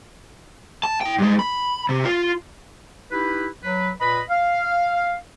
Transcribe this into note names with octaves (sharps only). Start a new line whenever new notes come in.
A5
E4 G5
G2 G#3
B5
C3
F4
D#4 E4 G4 B4
F#3 B4
A#2 B4 D#5 B5
F5